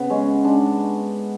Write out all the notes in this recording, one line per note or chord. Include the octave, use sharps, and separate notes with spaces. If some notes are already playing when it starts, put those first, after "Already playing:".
Already playing: C#3 B3
G#3 C#4
G#3 D4